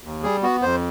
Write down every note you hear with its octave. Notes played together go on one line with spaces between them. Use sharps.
D#2
G3 G#4
B3 F#4
F2 C5